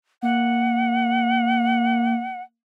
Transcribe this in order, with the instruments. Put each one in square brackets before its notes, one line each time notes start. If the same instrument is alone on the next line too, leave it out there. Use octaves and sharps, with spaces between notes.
[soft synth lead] A#3 [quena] F#5